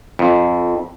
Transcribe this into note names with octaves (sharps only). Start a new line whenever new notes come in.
F2